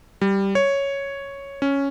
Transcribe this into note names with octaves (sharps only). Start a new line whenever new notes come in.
G3
C#5
C#4